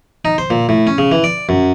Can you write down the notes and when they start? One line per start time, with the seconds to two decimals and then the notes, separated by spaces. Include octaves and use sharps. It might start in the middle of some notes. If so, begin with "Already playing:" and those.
0.25 D#4
0.38 C5
0.50 A#2
0.69 A2
0.87 C#4
0.98 C#3
1.12 E3
1.24 D5
1.49 F#2